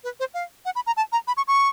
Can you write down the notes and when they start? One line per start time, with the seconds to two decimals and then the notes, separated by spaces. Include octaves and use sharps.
0.04 B4
0.20 C5
0.34 F5
0.65 F#5
0.75 B5
0.87 A#5
0.97 A5
1.12 A#5
1.27 B5
1.37 C#6
1.48 C#6